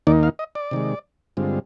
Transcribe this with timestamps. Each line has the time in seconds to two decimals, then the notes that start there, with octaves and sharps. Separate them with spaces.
0.07 D#2 D#3 A#3 D#4 D5
0.23 F5
0.39 D#5
0.55 D5
0.71 C3 D#3 G#3
1.37 G2 D3 G#3 C4 F4